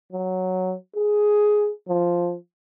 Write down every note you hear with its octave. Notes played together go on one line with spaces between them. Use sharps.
F#3
G#4
F3